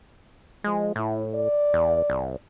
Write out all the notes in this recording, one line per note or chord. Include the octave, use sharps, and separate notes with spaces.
F3 G#3
A2 E4
D5
E2
C2